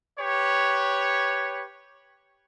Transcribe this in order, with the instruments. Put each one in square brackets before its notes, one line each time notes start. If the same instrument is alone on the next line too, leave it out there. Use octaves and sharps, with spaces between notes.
[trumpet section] G4 B4 C#5